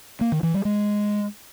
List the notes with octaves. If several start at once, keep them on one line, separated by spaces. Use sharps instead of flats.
A#3
D#3
E3
G3
G#3